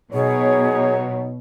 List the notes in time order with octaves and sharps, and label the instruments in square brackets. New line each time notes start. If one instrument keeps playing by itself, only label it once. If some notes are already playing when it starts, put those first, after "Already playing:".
[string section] B2 [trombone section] F#3 D#4 [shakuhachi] G#4 [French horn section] C#5